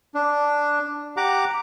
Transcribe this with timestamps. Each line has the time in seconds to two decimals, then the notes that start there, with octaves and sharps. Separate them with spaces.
0.14 D4
1.17 G4 F#5 A#5 D6